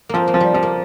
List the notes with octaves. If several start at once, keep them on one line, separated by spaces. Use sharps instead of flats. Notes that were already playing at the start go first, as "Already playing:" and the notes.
F3 A#3 C4
A#3
F3
G3
F3 G3
A#3